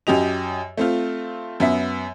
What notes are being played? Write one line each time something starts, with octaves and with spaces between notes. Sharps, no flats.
F#2 F#3 G4 D#5 F7
A3 C4 F4
F#2 B3 E5